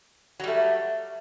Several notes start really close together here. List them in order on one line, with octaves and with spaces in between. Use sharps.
F#3 G3 A3